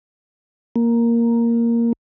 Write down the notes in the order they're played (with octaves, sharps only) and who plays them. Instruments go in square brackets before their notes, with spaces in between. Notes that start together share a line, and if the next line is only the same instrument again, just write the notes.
[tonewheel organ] A#3